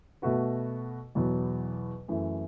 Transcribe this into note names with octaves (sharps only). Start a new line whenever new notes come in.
B2 A3 F#4 B4
E2 B2 F#3
F#2 E3 A3